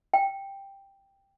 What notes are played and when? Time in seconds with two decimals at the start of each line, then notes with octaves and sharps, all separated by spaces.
0.14 G5